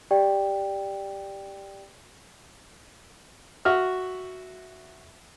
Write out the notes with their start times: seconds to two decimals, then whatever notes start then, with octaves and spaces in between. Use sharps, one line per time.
0.11 G4 D5 G5
3.65 F#4 E5 F6